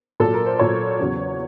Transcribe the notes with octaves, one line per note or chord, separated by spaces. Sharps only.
A#2 F#3 A4
A#4
C5
A#2 F#3 C#5
E2 C#3 F#3